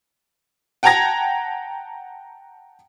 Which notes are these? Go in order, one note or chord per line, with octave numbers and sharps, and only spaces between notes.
F#5 G5 A5 A#5 G#6 A#6